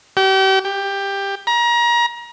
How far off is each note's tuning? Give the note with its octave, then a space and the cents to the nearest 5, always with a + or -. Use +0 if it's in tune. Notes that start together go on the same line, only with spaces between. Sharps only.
G4 -35
G4 +15
A#5 +30